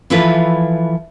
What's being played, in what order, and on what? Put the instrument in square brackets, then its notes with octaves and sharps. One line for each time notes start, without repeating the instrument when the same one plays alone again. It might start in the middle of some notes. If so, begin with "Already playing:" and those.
[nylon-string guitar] E3 F3 E4 F4 A4 B4